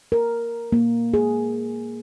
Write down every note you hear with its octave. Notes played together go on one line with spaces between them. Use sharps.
A#4
A#3
G#4